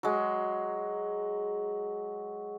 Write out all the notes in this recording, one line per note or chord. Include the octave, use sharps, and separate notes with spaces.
F#3 G#3